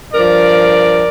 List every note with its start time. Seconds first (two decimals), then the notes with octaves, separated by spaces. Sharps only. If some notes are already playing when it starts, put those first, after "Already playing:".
0.13 G2 F3 A#4 D5